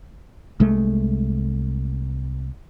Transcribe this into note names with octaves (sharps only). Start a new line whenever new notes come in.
C2 G#3 A3